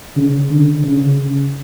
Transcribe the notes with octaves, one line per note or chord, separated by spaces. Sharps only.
C#3
D3
C#3